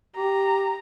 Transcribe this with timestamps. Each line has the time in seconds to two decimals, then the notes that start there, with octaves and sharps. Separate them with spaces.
0.16 G4 A#5